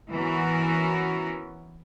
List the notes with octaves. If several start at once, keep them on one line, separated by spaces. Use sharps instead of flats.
E3 B3 C#4 F#4 A#4